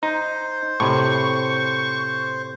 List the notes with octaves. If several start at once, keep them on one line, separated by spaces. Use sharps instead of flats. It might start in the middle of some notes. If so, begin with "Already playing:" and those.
D#4 C5
A2 C3 C#6